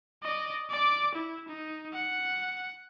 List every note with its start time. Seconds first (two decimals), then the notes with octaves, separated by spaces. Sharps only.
0.22 D5 D#5
0.70 D5 D6
1.14 E4
1.48 D#4
1.93 F#5